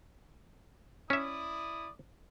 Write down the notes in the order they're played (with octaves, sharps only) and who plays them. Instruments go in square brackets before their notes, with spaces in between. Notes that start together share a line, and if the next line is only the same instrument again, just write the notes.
[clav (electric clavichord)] C#4 E5 [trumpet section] E4 D5 D#6